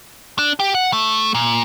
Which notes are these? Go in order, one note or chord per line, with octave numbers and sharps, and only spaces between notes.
D4
G4
F#5
A3
A#2